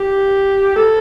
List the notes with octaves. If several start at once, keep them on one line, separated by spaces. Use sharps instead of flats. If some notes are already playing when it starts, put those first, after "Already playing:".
Already playing: G4
A4